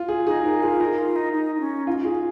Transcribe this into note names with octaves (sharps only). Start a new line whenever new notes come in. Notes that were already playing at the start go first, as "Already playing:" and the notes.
Already playing: F4
G#4
D#4 G#4
D#4 A#4
F4 G#4
D#4 A#4
F4
D#4
D#4
D#4
C#4
D#4 F4
F4 G#4